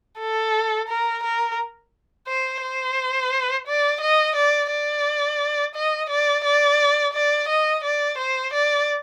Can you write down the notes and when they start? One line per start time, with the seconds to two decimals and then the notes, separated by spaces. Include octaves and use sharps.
0.19 A4
0.88 A#4
1.23 A#4
2.28 C5
2.62 C5
3.67 D5
4.01 D#5
4.36 D5
4.71 D5
5.75 D#5
6.10 D5
6.45 D5
7.13 D5
7.48 D#5
7.84 D5
8.18 C5
8.53 D5